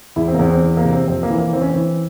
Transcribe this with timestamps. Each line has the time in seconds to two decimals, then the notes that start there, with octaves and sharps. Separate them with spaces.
0.16 E2 E4
0.28 C4
0.34 A#3
0.39 E2 C4
0.50 C4
0.62 E3
0.77 A#3
0.85 C3
0.92 C4
1.07 F2 C4
1.23 A#3
1.30 E3
1.38 A#3
1.53 E3 C4
1.61 C#4
1.69 C4
1.76 E3